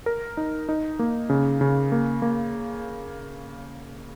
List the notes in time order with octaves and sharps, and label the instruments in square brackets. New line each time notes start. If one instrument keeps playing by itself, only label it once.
[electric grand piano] A#4
D#4
D#4
A#3
C#3
C#3
A#3
A#3